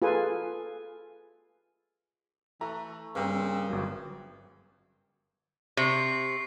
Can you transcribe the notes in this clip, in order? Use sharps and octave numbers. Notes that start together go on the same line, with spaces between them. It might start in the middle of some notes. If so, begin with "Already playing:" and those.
F4 G#4 A4 B4 G#5
E3 A3 A#5
G2 C#3 A#3 C4
G1 F#3
C3 C#6 C7